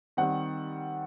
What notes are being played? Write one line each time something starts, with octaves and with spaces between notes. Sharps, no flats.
D#3 G3 C4 F#5